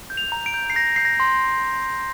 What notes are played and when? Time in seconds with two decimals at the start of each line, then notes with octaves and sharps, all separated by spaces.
0.10 G6
0.17 F7
0.32 A#5
0.46 D7
0.54 G6
0.70 C7
0.75 G6 A#6
0.96 G6 C7
1.05 A#6
1.20 C6